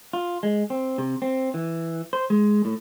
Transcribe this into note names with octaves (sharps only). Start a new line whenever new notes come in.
F4
G#3
C4
C3
C4
E3
C5
G#3
A2